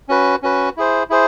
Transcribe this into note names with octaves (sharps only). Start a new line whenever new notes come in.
C#4 F#4 B4
C#4 F#4 B4
E4 G#4 C5
E4 G#4 C5